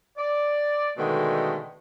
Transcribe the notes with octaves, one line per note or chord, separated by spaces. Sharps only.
D5
B2 D3 D#3 G#3 A3